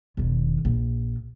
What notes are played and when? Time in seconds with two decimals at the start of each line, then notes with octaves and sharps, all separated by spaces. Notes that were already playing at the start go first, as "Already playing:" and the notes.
0.17 E1 D#3
0.65 A#1